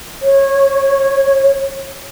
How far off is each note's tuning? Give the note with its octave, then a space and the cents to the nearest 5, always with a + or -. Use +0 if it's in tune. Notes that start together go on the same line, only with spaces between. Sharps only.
C#5 -20